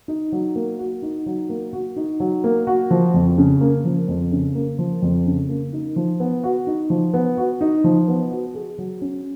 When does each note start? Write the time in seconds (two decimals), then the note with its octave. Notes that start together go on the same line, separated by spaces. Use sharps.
0.08 D#4
0.32 F#3
0.55 A#3
0.79 F#4
1.02 D#4
1.26 F#3
1.49 A#3
1.73 F#4
1.96 D#4
2.20 F#3
2.44 A#3
2.67 F#4
2.91 F3
3.14 F2
3.38 C#3
3.61 A#3
3.85 F3
4.08 F2
4.32 C#3
4.55 A#3
4.79 F3
5.02 F2
5.26 C#3
5.49 A#3
5.73 D#4
5.96 F3
6.20 B3
6.44 F#4
6.67 D#4
6.90 F3
7.14 B3
7.37 F#4
7.61 D#4
7.84 F3
8.08 B3
8.31 F#4
8.55 G#4
8.78 F#3
9.01 C#4